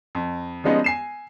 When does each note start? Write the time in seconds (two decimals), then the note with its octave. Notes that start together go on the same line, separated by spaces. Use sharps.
0.15 F2
0.64 F3 G3 G#3 B3 C#4 D#4
0.84 G#5 C7 E7